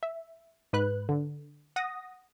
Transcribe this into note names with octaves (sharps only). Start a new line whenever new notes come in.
E5
G#2 B4 F#6
D3
F#5 D#6 A#6